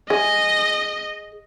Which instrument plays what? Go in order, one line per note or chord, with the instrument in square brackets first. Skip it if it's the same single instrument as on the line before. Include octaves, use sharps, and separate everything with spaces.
[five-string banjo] G#4 [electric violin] D#5